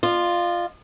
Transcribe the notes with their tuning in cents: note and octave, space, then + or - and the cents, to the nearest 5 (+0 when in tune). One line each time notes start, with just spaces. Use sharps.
F4 +0 D#5 -45